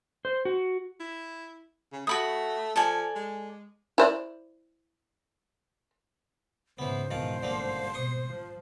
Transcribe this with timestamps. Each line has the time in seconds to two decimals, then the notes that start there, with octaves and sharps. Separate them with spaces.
0.25 C5
0.45 F#4
1.00 E4
1.92 C#3
2.07 A3 F#4 B5 D#6
2.76 F3 A4 D5 G#5
3.15 G#3
3.98 E4 C5 D5
6.79 G#2 C#3 E3 B3 C5
7.11 E2 G#2 B2 D#3 F3 F4
7.43 G#1 G2 D3 F3 A#3
7.94 B2 C6 C#6 D#6
8.29 F3